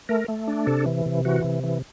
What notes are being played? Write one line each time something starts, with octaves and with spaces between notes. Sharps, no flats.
A3 A#4
A3
D4
C3 A4
E3
C3
E3 F#4
C3
E3